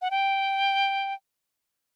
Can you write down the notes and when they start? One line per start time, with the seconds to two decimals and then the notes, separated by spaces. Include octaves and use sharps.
0.02 F#5
0.11 G5